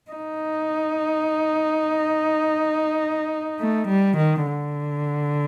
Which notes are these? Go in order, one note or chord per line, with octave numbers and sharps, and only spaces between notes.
D#4
A3
G3
D#3
D3